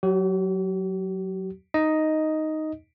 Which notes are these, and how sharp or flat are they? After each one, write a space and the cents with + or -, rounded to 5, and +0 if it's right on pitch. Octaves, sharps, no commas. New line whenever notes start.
F#3 +0 G4 -45
D#4 +0 D#5 +5